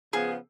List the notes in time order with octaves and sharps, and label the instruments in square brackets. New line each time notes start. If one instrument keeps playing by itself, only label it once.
[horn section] C#3 F3 B3 [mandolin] G#4